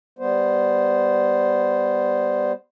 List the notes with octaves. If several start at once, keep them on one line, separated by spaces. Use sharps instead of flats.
G3 B3 C5